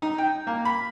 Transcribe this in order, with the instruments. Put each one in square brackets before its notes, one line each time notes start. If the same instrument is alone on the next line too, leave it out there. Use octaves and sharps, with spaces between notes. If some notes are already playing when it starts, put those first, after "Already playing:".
[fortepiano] D#4
G5
A#3
B5